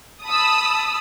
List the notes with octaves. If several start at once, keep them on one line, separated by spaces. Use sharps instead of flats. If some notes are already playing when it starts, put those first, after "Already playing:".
A5 B5 D#6 E6